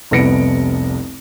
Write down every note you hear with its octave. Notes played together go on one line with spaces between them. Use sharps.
F1 C2 B3 A#6 C#7 D7